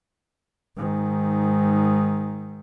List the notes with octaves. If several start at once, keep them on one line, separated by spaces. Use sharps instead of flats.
G#2 D#3